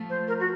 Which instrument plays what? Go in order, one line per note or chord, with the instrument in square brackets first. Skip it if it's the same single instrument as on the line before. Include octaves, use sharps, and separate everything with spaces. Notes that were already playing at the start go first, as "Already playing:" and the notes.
Already playing: [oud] F3 A3
[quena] C5
A#4
F#4